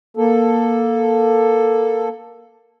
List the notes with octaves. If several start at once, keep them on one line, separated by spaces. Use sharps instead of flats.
A#3 A4